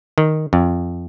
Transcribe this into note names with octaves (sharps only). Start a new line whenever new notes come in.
D#3
F2